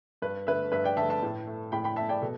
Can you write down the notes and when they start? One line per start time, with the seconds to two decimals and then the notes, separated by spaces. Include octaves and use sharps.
0.22 G2 B4
0.47 D3 A3 B4 E5
0.72 G2 B4 E5
0.84 D5 G5
0.97 D3 A3 E5 A5
1.10 E5 A5
1.23 A2
1.47 A3
1.72 A2 G5 B5
1.84 G5 B5
1.96 A3 E5 A5
2.09 D5 G5
2.22 B2 A4